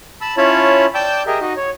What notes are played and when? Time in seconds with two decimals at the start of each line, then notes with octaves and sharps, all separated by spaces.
0.21 A5 B5 E6
0.37 C#4 E4 F4 C#5 A5 B5
0.95 D5 G5 A5 D6 E6 G6
1.27 G4 G#4 A#4 D#5 E5
1.41 D#4 F#4 D#5
1.57 C#5